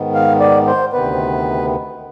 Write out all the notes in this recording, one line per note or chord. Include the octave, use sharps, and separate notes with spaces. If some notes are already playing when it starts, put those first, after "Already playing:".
Already playing: G#2 D#3 B3
F5
D5
C5
D2 C3 D#3 B3 B4